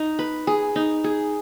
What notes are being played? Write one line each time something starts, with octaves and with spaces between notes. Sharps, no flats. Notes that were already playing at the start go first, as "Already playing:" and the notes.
Already playing: D#4
B4
G#4
D#4
G#4